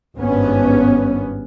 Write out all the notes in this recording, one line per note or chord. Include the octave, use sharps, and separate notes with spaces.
G#1 G2 B3 C#4